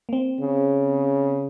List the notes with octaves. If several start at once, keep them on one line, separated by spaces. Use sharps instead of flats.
A#3
C4
C#3